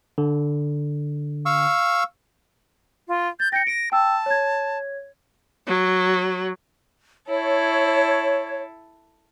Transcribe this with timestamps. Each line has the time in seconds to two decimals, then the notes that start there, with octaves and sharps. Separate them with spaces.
0.18 D3
1.46 F5 C#6 E6
3.08 F4
3.40 G6 A6
3.52 G5 A#6 C#7
3.67 A#6 D7
3.92 G5 A5 E6
4.26 C#5 G#6
5.67 F#3
7.28 E4 A4 C#5